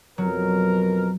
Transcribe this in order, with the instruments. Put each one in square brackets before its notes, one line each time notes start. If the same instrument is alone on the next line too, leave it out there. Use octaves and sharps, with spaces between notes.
[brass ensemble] F2 B2 A#4 [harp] F#3